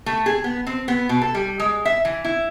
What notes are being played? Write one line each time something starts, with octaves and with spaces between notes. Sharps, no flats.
A3
G#4
B3
C4
B3
B2
A4
G3
G#3
E5
E3
E4